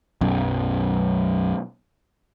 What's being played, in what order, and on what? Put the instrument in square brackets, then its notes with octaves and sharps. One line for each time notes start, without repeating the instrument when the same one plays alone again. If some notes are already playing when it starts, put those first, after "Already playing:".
[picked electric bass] B1 F#2